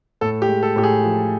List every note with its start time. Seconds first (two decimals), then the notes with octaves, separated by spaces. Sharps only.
0.21 A2 A4
0.42 G4
0.49 G#3
0.63 A4
0.76 A2 G4
0.83 G#4
1.03 F3